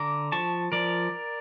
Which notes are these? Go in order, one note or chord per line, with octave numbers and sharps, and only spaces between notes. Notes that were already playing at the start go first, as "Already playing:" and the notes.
Already playing: D3 A#5 D6
F3 A5 C#6
F3 A#4 D5